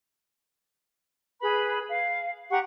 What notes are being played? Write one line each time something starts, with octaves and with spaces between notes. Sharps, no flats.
G#4 B4 B5
F5
G4 F#5 A#5 C#6